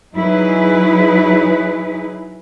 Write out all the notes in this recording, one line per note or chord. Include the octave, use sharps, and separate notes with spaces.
F#3 D#4 E4 G#4 B4